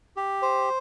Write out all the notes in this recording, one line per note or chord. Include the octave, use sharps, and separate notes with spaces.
G4
C5